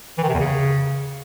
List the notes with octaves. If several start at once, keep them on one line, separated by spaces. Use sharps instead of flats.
E3
D#3
C3
E2
C#3